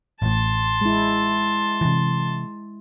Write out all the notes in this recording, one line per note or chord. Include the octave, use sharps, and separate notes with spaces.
A1 A2 A5 C6
G#3 E4
C3 E3